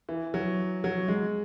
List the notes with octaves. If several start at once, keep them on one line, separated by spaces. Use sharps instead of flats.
E3
F#3
F#3
G#3